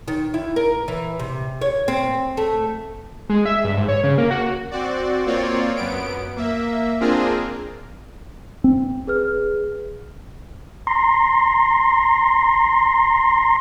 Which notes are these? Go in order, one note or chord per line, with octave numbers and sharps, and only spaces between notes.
D#3
E4
A#4
E3
C3
C#5
C4
A3
G#3
E5
G2
G#2
C#5
C#3
A#3
F#4
C4 F#4 D5
A#3 C4 F4 C#5 D5
F#2 B3 D7
A#3 E5
A#3 C4 D4 F4 G#4 A#4
C4
G#4 B4 F6
A#5 C6